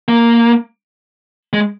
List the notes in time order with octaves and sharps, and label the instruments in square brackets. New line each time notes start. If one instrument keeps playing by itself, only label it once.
[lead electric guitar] A#3
G#3